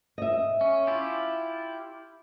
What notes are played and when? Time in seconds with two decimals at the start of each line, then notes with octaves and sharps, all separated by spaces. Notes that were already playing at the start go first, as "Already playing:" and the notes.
0.18 D#5 E5
0.61 C#4
0.87 E4 F4 G4